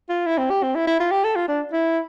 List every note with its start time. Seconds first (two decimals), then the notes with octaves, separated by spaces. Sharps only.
0.09 F4
0.26 E4
0.38 C4
0.50 G4
0.63 C4
0.75 E4
0.87 E4
1.00 F4
1.11 G4
1.24 A4
1.36 F4
1.48 D4
1.73 E4